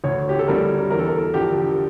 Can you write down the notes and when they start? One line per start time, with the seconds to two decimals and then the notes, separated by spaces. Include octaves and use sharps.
0.04 D2 C#5
0.29 G4
0.39 A4
0.48 D3 G3 A#4
0.90 E2 A#4
0.99 A4
1.08 A#4
1.34 D3 F3 G4